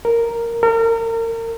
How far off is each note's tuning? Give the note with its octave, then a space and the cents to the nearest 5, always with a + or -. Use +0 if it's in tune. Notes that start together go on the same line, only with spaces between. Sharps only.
A#4 -5
A#4 -35